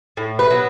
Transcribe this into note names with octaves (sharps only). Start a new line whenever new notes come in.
A2
B4
F#3 B3